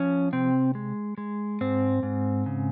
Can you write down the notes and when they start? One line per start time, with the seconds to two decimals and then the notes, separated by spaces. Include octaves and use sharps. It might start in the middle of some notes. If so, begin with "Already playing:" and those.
Already playing: F3 C#4
0.32 C3 C4
0.75 G#3
1.18 G#3
1.61 G#2 C4
2.03 G#2
2.46 C#3